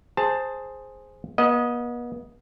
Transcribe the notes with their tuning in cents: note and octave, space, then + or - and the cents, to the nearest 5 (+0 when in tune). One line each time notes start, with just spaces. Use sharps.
G#4 +0 C5 +0 A5 +15
B3 -40 D#5 +0